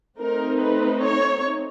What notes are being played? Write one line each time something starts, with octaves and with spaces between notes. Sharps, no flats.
A3 C4 D#4 A#4
B4
C#5